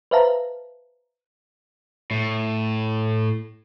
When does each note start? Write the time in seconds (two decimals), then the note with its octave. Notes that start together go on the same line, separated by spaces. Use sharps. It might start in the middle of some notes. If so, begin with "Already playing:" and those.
0.11 B4 C5 E5 F5 A5 A#5
2.11 A2